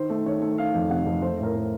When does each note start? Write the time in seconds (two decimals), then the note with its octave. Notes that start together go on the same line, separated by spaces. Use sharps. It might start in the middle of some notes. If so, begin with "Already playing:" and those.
Already playing: D#3 C5
0.09 A3
0.26 D#3 C#5
0.42 A3
0.58 D#3 F5
0.73 F2
0.90 C3 F#5
1.05 F2
1.22 A3 C5
1.38 A2
1.43 A#4
1.54 A3